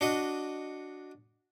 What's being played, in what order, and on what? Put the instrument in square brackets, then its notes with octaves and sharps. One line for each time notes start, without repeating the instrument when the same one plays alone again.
[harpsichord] D4 F#4 D#5